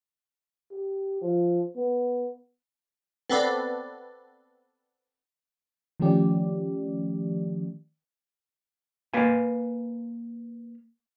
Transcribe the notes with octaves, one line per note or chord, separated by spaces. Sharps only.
G4
F3
B3
B3 C4 A4 B4 D5
D#3 F3 A3 C#4 G4 D5
A#3 B4 F5 G#5